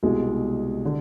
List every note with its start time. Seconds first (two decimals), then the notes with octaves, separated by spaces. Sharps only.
0.03 C2 B2 G#3
0.85 D3